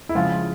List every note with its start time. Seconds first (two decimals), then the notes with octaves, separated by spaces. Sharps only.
0.09 E4
0.15 C#3 F3 G#3 F4